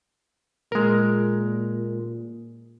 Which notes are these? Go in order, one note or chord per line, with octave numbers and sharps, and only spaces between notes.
A#2 G#3 A#4